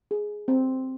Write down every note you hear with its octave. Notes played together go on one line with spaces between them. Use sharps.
G#4
C4